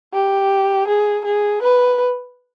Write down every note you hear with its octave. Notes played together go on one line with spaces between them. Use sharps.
G4
G#4
G#4
B4